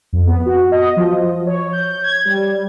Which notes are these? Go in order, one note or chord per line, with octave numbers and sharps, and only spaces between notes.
F2
B3
F#4
D#5
F3
C#5
G6
G#6
G3